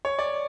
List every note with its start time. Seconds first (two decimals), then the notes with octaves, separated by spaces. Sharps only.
0.05 C#5
0.19 D5